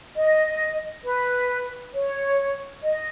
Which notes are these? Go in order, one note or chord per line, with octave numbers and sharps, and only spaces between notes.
D#5
B4
C#5
D#5